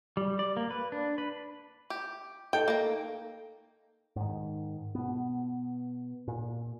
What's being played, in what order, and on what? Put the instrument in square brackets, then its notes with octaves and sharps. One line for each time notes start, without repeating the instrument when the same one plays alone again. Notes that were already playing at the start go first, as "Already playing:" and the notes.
[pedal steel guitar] G3
D5
A#3
B4
D4
B4
[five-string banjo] G4
[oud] D#4 A4 [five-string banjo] G5
[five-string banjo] A#3 A#5
[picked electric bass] G#2 D#3
B2 B3
A#2